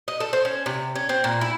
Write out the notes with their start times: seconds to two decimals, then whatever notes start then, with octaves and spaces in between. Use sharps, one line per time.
0.08 D#5
0.20 A4
0.33 C5
0.45 C#4
0.66 C3
0.96 C#4
1.09 C4
1.24 A#2
1.41 E4